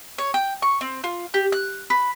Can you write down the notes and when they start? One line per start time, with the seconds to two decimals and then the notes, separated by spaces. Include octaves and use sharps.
0.18 C#5
0.34 G5
0.62 C#6
0.81 C4
1.04 F4
1.34 G4
1.52 F#6
1.90 B4